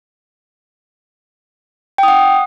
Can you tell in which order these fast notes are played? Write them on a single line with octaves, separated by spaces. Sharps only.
G5 D#6 F#5